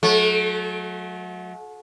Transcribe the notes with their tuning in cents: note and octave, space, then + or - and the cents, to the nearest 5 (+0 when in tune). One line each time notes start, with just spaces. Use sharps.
F#3 -30 A3 -40